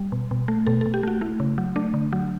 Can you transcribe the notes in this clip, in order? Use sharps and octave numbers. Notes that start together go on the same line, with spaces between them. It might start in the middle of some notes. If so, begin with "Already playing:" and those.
Already playing: G3
B2
B2
A3
B2 A4
A4
B2
G4
A3 F#4
A3 E4
C#3
F#3
A3 D4
D3
F#3